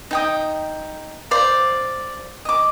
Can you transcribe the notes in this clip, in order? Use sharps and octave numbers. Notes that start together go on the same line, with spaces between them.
D#4 G5 D#6
C5 D5 F5 D6
D#5 D6